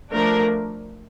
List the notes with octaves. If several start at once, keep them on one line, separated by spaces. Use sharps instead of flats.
F3 A3 D4 A#4